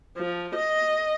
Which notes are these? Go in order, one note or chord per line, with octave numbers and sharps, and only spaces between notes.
F3
D#5